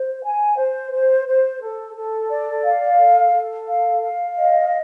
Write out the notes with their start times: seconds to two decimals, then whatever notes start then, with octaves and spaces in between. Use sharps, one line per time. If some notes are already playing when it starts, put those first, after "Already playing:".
Already playing: C5
0.23 G#5
0.57 C5
0.91 C5
1.25 C5
1.61 A4
1.95 A4
2.29 D5
2.64 F5
2.98 A4
3.32 A4
3.66 F5
4.01 F5
4.36 D#5